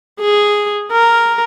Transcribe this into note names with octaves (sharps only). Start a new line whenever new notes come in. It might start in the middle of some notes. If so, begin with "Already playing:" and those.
G#4
A#4